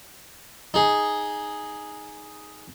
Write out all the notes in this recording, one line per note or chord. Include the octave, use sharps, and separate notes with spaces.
D#4 G#4